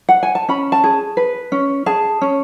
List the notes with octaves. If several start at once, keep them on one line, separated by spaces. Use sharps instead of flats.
F#5
G#5
A5
C#4 B5
A5
G#4
B4
C#4
G#4 A5
C#4